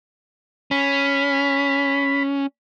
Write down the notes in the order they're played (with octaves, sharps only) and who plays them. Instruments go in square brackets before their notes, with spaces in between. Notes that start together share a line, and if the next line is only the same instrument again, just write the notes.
[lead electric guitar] C#4 [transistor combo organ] B5